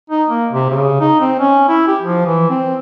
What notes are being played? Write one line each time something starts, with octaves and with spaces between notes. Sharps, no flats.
D#4
A#3
C3
C#3
D#4
C4
C#4
E4
G4
F3
E3
C4